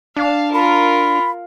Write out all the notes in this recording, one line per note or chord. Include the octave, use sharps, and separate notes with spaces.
D4 F5 A5
F4 A#4 B5